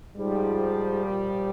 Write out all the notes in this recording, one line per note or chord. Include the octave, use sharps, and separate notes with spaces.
G#2 F3 G3
A#2 F3